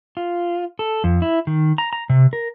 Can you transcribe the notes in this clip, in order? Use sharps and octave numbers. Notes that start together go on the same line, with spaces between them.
F4
A4
F2
E4
D#3
A#5
A#5
C3
A#4